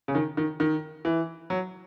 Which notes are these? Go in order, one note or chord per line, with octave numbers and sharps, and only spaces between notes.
C#3
D#3
D#3
D#3
E3
F#3